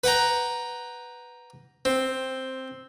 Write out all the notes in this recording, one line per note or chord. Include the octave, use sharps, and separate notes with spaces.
B4 F#5 G5 A#5
C4